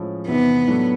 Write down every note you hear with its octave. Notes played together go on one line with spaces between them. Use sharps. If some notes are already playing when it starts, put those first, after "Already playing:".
Already playing: A2 F3 G#3 C#4
E2 C3 D#3 B3
A2 F#3 A3 D4